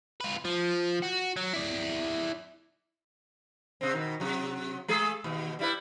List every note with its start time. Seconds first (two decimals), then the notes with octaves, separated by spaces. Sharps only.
0.21 F4 B4
0.45 F3
1.03 F#4
1.37 F#3
1.53 E4 D5
3.81 C3 C4
3.93 B2 D#3
4.20 C3 F#3
4.88 G#3 G#4 A4
5.24 D#2 B2
5.59 G3 E4 B4